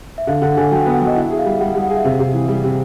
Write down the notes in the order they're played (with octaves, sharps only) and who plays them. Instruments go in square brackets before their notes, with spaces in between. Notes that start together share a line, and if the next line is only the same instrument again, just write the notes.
[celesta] E5
[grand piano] D3 [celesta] F5
[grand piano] D3 [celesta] F#5
[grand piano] D3 [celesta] G#5
[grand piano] F#3 [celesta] G5
[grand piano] B3
[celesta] F#5
[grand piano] F#3
[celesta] D#5
[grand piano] E4 [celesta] E5
[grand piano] G#4
[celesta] F5
[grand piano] G3
[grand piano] G3 [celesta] F#5
[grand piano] G3
[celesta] F#5
[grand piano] G#4 [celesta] F5
[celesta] E5
[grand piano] C3 [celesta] F5
[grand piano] C3
E3
G3
C3